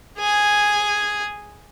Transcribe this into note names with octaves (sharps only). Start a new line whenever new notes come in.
G#4 G#5